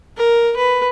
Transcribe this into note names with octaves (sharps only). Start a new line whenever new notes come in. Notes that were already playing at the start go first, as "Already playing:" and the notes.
A#4
B4